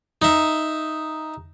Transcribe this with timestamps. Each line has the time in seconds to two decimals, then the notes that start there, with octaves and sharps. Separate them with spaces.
0.22 D#4 E5